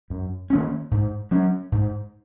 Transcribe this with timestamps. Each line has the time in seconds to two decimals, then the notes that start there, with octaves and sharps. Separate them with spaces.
0.10 F#2
0.50 D#3 A#3 C#4
0.91 G#2
1.31 F#3 C#4
1.72 G#2